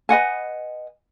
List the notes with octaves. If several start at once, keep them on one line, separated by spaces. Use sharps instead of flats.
B4 D#5 F#5 G#5